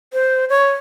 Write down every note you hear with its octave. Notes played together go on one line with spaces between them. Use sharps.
C5
C#5